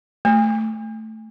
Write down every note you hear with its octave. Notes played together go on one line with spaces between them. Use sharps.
A3